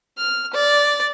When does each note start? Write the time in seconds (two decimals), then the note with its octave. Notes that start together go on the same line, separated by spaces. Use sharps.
0.17 F6
0.53 D5